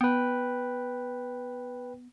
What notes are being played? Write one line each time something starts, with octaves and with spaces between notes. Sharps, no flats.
B3 B4 G5